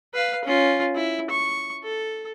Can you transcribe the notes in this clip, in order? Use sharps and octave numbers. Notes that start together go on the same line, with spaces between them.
B4 F5
C#4 F4
E4
C#6
A4